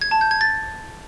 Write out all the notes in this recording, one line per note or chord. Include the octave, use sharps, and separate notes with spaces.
G#6
A5
G6
G#6
A6